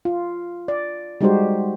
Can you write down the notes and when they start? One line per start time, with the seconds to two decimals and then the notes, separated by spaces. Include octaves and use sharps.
0.05 F4
0.68 D5
1.21 G3 G#3 D#4 F#4 G4 C5